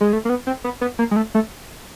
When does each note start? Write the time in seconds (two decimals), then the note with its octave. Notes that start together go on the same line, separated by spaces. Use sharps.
0.01 G#3
0.13 A3
0.25 A#3
0.29 B3
0.47 C4
0.64 B3
0.81 B3
0.99 A#3
1.11 G#3
1.16 A3
1.35 A3